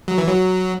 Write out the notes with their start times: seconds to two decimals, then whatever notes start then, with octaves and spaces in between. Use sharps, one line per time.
0.08 F#3
0.18 E3
0.28 F#3